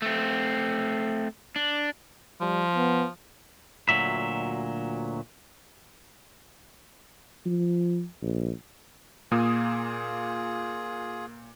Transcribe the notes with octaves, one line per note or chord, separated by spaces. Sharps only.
A3 C4
D4
F3 G3
B3
D2 A#2 F#3 E5
F3
A#1
A#2 A#3 F4 G#4 D#6